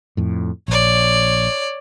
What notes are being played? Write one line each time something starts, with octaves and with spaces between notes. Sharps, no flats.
F2 A2
A#1 C#5 D5